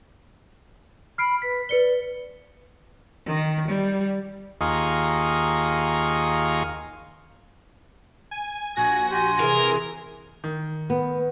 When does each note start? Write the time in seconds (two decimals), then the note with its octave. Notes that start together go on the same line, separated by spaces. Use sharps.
1.18 B5 F6 C7 D7
1.42 B4 B6
1.69 B4 D5 C#7 G7
3.26 D#3
3.68 G3
4.61 D#2 F4 G#4 D#5 A#5 C#6
8.31 G#5
8.76 A#1 F#4 G#5 A#6
9.10 G4 G#5 C6
9.40 C3 E3 G#4 A#4
10.44 D#3
10.90 B3